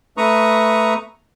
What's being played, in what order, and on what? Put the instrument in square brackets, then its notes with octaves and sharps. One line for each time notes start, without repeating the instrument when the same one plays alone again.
[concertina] A3 B4 A#5 C#6 D#6